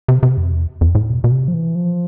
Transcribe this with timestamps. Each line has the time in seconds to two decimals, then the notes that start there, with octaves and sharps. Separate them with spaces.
0.08 C3
0.23 C3
0.37 F2
0.52 E2
0.81 F2
0.95 A2
1.10 B2
1.24 B2
1.32 C3
1.48 F3
1.54 E3
1.75 F3